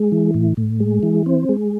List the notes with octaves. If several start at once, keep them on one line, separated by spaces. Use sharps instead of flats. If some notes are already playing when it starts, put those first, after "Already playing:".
Already playing: G#3
E3
A2
A2
G#3
E3
C4
G#3